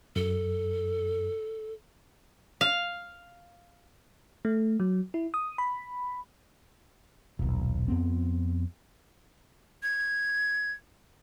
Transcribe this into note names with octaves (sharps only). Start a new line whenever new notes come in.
F#2 A4
F5
A3
F#3
E4
D#6
B5
D#1 B1
F2 B3 C4
G#6